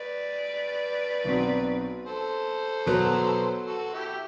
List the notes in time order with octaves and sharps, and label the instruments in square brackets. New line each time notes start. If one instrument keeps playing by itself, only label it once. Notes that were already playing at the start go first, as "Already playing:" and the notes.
Already playing: [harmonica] B4 D5
[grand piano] B1 B2 F#3 C4 F#4
[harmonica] A4 C5
[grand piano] B2 F#3 B3 F#4 B4
[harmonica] F#4 A4
E4 G4